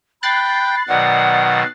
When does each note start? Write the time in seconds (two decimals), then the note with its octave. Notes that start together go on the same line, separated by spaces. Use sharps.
0.23 G5 B5 F#6 A6 C7
0.89 B2 D#3 F#3 D5 F#5